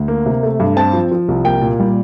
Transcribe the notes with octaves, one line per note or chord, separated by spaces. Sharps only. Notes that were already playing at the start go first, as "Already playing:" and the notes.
Already playing: D2
A#3
C3
A3
G2
C4 A5
F3
F3
C2
A#3 G5
A#2
G3